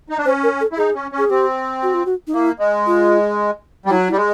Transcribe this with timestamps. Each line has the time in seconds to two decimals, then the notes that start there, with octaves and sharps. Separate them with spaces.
0.09 D#4
0.18 D4
0.26 C#4 C5
0.43 A#4
0.61 A4
0.72 E4
0.77 D#4 G#4
0.95 C#4
1.12 C#4
1.18 G#4
1.30 C4 G4
1.83 F#4
1.94 F4
2.06 F#4
2.27 D#4
2.34 A#3 E4
2.60 G#3
2.87 F4
3.86 G3
3.90 F#3 E4
4.08 E4
4.12 G3
4.17 G#3